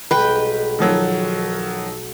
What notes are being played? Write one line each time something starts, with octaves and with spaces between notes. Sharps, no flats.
B1 G3 G#3 B4 G5
D#3 F3 F#3